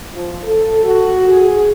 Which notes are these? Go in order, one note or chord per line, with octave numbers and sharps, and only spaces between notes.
F3
A4
F#4
G#4